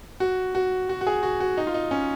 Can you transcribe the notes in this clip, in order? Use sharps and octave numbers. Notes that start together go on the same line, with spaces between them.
F#4
F#4
F#4
F#4
G#4
F#4
F#4
D#4
F4
D#4
C#4